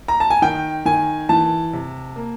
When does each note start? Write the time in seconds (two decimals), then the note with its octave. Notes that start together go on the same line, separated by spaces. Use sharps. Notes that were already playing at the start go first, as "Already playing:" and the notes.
0.08 A#5
0.20 A5
0.30 G#5
0.42 D#3 G5
0.85 D#3 G#5
1.29 E3 A5
1.73 C3
2.16 A#3